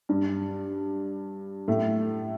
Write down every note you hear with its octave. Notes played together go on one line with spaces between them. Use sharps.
G2 G3
A2 A3